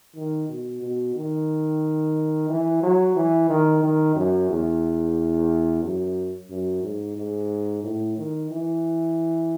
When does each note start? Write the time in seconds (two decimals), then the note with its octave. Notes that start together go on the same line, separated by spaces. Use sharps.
0.16 D#3
0.49 B2
0.82 B2
1.16 D#3
2.49 E3
2.83 F#3
3.16 E3
3.49 D#3
3.83 D#3
4.16 F#2
4.50 E2
5.83 F#2
6.50 F#2
6.83 G#2
7.17 G#2
7.84 A2
8.17 D#3
8.51 E3